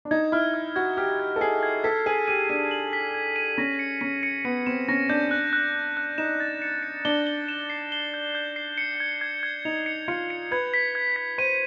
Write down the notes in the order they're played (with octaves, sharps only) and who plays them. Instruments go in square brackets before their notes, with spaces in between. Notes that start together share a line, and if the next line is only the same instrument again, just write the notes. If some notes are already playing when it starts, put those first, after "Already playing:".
[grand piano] D4
[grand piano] D#4 [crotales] G#6
[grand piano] E4 [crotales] F6
[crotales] F6
[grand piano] F#4 [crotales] G#6
[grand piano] G4 [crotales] F6
[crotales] G#6
[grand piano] A4
[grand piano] G#4 [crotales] C7
[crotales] G#6
[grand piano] A4 [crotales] B6
[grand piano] G#4 [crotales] D#7
[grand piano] G4 [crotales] D#7
[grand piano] D4 [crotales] D#7
[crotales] F#7
B6
G#6
D#7
[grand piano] C#4 [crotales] A#6
[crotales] C#7
[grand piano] C#4 [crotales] C#7
[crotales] C#7
[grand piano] B3 [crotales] C#7
[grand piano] C4 [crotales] E7
[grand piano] C#4 [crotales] A#6
[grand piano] D4 [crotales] G6
[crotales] F#6
F#6
F#6
F#6
[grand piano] D#4 [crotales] E7
[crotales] A6
C#7
C#7
[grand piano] D4 [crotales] G7
[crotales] G7
E7
C7
G7
G6
G6
C7
C#7
G#6
G#6
G#6
[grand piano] D#4 [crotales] F7
[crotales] C#7
[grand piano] F4 [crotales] C#7
[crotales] C#7
[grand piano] B4 [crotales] G#6
[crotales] B6
G#6
B6
[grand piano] C5 [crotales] D#7